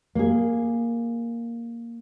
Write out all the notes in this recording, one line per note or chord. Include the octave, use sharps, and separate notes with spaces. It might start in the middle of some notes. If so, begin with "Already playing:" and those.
A#3 G#4